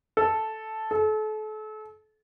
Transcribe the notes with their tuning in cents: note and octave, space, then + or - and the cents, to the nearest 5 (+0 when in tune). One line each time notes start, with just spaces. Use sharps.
A4 -5
A4 -35